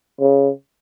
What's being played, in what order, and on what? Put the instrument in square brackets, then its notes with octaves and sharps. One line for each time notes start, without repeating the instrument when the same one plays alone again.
[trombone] C#3